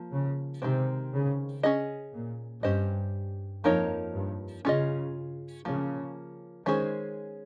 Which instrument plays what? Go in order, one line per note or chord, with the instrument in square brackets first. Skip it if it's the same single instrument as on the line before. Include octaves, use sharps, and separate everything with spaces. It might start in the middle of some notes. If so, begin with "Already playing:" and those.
Already playing: [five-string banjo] F3 A#3
[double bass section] C#3
[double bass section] C3 [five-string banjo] D#3 G#3 C4
[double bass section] C#3
[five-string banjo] C#4 G#4 D#5
[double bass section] A#2
[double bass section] G2 [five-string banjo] C#4 G4 C5 D#5
[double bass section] F2 [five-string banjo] F3 A#3 D#4 A#4 C#5
[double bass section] G2
[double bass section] C#3 [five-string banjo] C#4 F4 G#4 D#5
[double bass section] C#3 [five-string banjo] F3 A#3 C#4
[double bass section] D#3 [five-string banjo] G#3 C#4 G#4 C5